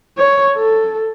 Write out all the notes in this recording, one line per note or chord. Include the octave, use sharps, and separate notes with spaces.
C#5
A4